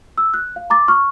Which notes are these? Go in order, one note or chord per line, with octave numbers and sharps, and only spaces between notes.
E6
F#6
F5
A#5 D6 A6
C#6 F6